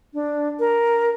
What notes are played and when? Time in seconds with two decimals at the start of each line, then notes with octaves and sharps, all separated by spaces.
0.14 D4
0.60 A#4